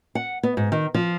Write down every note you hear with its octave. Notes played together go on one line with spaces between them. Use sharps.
F#5
B3
G#2
D#3
F3